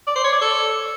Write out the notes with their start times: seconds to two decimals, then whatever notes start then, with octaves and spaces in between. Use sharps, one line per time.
0.07 D5
0.16 C5
0.24 C#5
0.33 D5
0.41 A4